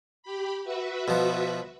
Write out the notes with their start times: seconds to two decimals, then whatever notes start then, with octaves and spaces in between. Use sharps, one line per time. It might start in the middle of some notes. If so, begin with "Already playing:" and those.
0.23 G4 B5
0.64 F#4 B4 E5
1.08 B2 F3